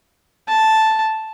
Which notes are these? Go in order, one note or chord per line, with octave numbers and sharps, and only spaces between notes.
A5